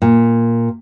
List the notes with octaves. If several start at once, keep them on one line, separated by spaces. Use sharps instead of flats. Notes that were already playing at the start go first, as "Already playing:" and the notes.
A#2